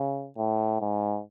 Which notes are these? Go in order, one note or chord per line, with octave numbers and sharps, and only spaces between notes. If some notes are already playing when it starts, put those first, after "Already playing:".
Already playing: C#3
A2
G#2